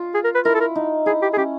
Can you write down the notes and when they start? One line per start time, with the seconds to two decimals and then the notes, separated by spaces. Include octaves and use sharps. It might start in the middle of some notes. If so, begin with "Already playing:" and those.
Already playing: F4
0.14 G#4
0.24 A#4
0.35 B4
0.45 E4 A#4
0.54 A4
0.60 A#4
0.76 D#4
1.06 E4 G#4
1.22 G4
1.33 G#4
1.37 C#4 G4